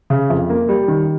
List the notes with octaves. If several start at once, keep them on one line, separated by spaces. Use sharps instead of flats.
C#3
F2
A#3
G3
D#3